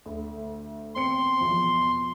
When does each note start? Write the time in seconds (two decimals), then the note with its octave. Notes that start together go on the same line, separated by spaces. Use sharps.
0.06 D2
0.95 E2 C4 C6 C#7
1.40 E2 B2 F3